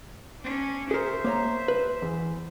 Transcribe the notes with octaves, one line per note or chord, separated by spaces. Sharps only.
C#4 D4
G#4 A#4 C5 E5
A#3 C#5 A#5
B4
E2